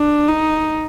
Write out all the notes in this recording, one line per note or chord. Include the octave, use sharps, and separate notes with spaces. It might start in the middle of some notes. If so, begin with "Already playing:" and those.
Already playing: D4
D#4